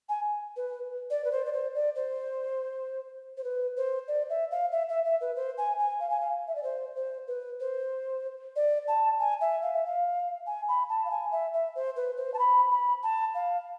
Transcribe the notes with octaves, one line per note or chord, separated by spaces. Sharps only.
G#5
B4
D5
B4
C5
D5
C5
D5
C5
C5
B4
C5
D5
E5
F5
E5
E5
E5
B4
C5
G#5
G#5
F5
G#5
F5
E5
D5
C5
C5
B4
C5
D5
A5
G#5
E5
F5
E5
F5
G#5
B5
A5
F5
G#5
E5
E5
C5
B4
C5
A5
B5
B5
A5
F5